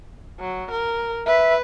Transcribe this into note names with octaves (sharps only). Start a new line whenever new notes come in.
F#3
A#4
B4 E5